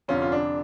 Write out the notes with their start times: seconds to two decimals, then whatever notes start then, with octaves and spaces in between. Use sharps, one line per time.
0.08 F1 F2 D3 C#4 F4
0.22 F4
0.32 D4